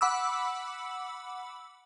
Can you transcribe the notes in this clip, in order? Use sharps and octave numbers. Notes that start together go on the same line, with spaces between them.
F#5 B5 D6 E6